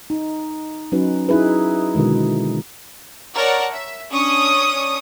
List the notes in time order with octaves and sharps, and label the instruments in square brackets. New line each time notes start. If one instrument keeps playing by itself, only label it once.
[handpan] D#4
F#3 C#4 D#4 F#4 B4
D#4 E4 G#4 B4
B2 D3 D#3 G#3
[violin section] A#4 C#5 D5 F#5 A5
E5
C#4 D4 C#6 D#6